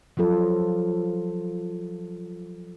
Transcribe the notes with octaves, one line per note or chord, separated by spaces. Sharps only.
F3 F#3 F4 A4